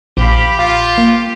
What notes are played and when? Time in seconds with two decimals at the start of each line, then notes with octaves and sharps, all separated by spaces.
0.17 A#1 G4 F5 B5
0.59 F4 F5
0.98 A#3